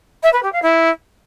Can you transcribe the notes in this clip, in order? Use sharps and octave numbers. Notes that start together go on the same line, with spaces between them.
E5
B4
G4
F5
E4